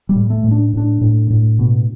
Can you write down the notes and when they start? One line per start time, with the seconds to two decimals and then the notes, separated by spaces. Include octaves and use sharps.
0.09 G3
0.15 A2
0.30 A3
0.44 A2
0.51 D4
0.73 A2 D4
1.01 A2
1.30 A2
1.59 B2